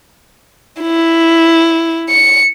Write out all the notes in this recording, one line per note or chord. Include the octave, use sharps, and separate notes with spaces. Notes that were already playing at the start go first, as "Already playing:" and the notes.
E4
C#7